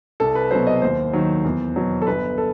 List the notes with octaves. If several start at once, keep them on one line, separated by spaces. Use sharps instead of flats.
C2 A4
B4
B2 F#3 C5
D#5
D#2 C5
D#3 F#3
E2
B2 F#3
A4
G1 B4
A4